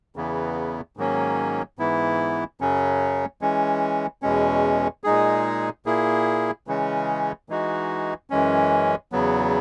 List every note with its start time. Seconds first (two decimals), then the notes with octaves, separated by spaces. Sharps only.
0.16 E2 C#3 E3 B3
0.97 G#2 D#3 F#3 A#3 C#4
1.79 G#2 E3 B3 E4
2.61 F#2 C#3 F#3 C#4
3.41 E3 G#3 C#4
4.22 E2 B2 G#3 C#4
5.04 A#2 G#3 D#4 G#4
5.86 A#2 A#3 E4 G#4
6.67 C#3 E3 G#3 C#4
7.49 E3 G#3 D#4 F#4
8.30 F#2 E3 G#3 C#4
9.12 E2 C#3 F#3 B3